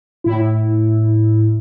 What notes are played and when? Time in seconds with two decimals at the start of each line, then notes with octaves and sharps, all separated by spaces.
0.24 A2 E4